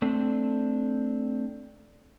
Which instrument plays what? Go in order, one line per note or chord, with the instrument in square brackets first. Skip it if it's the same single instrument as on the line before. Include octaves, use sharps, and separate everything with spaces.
[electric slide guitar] A3 C4 D4 A4